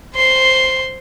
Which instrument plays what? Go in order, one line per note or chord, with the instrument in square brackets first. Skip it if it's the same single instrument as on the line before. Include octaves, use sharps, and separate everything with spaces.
[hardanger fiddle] C5 C6